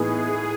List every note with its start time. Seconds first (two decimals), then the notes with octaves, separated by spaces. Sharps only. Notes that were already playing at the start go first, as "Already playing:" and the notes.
Already playing: A2 E3 B3 D#4 G#4